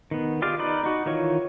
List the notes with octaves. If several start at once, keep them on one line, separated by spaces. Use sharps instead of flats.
D#3 B3
F4 G4 G#4 D5 F5
D#4 B4 D5
D#4 F#4
D#3 E3 F4 C#5 C#6